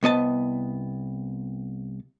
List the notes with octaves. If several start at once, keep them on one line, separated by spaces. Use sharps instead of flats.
C2 B3 D#5 A5